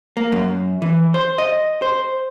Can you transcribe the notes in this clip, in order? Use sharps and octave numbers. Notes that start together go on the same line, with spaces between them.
A#3
F#2
E3
C5
D#5
C5